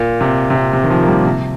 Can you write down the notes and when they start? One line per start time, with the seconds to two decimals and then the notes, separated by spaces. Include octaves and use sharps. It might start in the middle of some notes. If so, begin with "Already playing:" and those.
Already playing: A#2
0.21 C3
0.50 C3
0.55 A#2
0.73 C3
0.83 D#3
0.90 F3
1.02 A#3
1.08 G3
1.25 C3